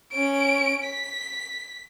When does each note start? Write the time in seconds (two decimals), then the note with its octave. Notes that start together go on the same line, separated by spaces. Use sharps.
0.12 C#4 D7
0.84 B6